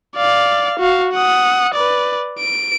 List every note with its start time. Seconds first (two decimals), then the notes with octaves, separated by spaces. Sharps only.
0.17 D5 F5
0.80 F#4 F5
1.13 F#5 D#6
1.74 B4 D5
2.39 D7